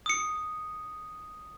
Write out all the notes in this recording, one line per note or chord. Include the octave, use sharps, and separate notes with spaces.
D#6 C#7